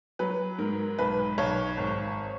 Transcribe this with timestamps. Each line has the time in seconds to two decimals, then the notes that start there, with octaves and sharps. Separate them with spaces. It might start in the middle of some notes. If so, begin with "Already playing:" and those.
0.19 F#3 B4
0.58 G#2 A#4
0.98 B1 B4
1.38 B1 C#5
1.77 G#1